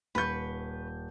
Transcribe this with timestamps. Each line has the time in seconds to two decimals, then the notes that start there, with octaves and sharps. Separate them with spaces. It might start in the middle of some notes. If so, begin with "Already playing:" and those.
0.15 D#1 B4 C#6 G6